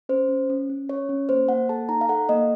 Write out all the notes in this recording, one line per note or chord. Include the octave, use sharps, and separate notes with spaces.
C#4 C5
C#4
C#4
C#4
C#4 C#5
C#4
A#3 C5
A#3 F#5
A4 A5
D#4 A#5
F5
A4 F#5
A#3 D#5